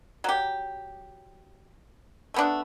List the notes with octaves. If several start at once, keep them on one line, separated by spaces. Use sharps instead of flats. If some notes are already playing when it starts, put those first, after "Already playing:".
F#3 G4
A3 B3 D4